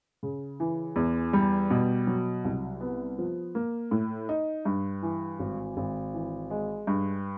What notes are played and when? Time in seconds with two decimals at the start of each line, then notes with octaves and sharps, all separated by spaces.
0.23 C#3
0.60 E3
0.96 E2
1.33 G3
1.70 B2
2.07 F#3
2.44 C2
2.81 B3
3.19 F3
3.55 A#3
3.91 A2
4.29 D#4
4.65 G2
5.03 E3
5.40 G#1
5.77 G#1
6.14 E3
6.50 G#3
6.87 G2